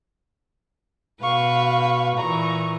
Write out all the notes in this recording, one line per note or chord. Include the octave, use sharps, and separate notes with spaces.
B2 B4 F5 C#6
A#2 E3 A#5 C#6